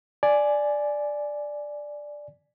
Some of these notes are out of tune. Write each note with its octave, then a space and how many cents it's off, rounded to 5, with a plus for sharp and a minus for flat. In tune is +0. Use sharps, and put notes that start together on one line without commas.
D5 +0 G#5 +10